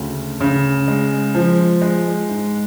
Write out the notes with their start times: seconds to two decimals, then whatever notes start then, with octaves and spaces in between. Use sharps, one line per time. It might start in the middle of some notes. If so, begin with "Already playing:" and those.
Already playing: D2 C#3
0.41 C#3
0.88 G#3
1.35 F3
1.81 G#3
2.29 G#2